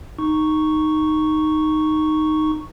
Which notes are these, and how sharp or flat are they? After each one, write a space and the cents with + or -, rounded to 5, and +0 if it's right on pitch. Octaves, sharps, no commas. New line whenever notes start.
D#4 -5 C#6 +0